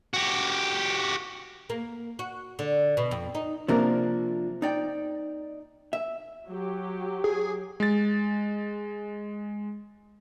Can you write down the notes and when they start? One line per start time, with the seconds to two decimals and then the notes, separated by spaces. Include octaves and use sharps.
0.14 F#4 G4
1.70 A#3
2.19 F#4
2.59 D3
2.97 B2
3.11 F2
3.35 D#4
3.68 C3 F3 A#3 D4 A#4
4.62 D#4 D5 G5
5.93 E5
6.47 F#3 G4
7.24 G#4
7.80 G#3 A6